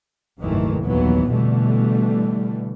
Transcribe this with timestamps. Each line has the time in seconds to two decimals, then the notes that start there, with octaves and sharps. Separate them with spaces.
0.40 F#1 D#2 G#2 D#3 E3 A3
0.84 F1 A#1 D#2 E3 F#3 B3
1.33 B2 D3 E3 G3 A3